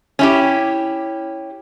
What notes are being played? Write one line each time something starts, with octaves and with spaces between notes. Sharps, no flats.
C#4 E4 G4